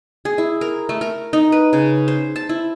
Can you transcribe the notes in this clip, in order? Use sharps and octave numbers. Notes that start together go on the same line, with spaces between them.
G#4
E4
A#4
A3
A#4
D#4
B4
C#3
C5
A5
E4